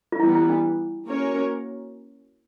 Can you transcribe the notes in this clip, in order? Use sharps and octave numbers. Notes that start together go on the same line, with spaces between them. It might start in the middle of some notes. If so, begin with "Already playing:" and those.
F4
E3 G3 B3 E4
E4
D4
A#3 C#4 F#4 A#4 C#5